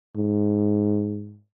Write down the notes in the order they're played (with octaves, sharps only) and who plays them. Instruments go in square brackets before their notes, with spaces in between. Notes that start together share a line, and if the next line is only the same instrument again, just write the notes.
[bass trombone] G#2